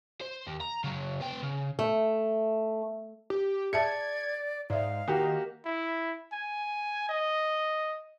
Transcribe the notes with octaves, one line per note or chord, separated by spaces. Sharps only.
C5
D#2
A#5
C#3 F#3
B3 G5
C#3
A3
G4
G#4 D5 E5 A5 G#6 C#7
G#2 D5 E5 F5
D#3 A#3 F#4 G4
E4
G#5
D#5